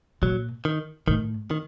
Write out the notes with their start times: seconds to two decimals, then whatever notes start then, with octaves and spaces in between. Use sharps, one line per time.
0.22 A#2 F#3
0.65 D#3
1.07 A2 D#3
1.51 D#3